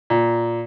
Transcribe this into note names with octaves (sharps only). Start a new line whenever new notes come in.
A#2